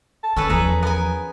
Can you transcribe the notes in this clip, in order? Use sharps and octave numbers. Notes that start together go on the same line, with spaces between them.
A5
D#3 C#4 A4 B4
E2 F3 G#4 B4 A#5
B3 A#4 G#5